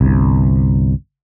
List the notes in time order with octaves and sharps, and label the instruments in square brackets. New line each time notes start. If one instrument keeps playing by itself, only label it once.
[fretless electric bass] G1 C2